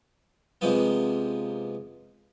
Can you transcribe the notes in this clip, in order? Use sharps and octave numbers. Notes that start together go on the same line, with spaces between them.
C3 F3 G#3 A#3 B3